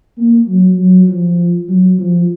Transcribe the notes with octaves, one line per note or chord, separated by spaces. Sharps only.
A#3
F#3
F#3
F3
F#3
F3